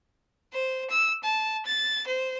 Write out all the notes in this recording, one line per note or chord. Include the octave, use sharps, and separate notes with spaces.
C5
E6
A5
A6
C5